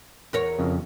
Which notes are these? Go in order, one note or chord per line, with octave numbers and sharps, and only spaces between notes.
E2 A#4 C#5
F2 C#3